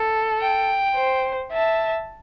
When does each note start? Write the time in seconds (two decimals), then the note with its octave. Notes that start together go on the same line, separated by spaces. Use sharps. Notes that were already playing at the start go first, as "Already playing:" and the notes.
Already playing: A4
0.41 G5
0.96 C5
1.52 E5 A5